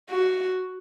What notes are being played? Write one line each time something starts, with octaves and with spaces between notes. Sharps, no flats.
F#4